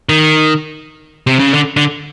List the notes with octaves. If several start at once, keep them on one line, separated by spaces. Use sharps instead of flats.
D#3
C3
C#3
D3
D3